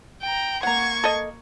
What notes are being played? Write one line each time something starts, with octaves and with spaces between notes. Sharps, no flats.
G5 A#5
A#3 F#5 A#5 C#6 G#6
A4 D#5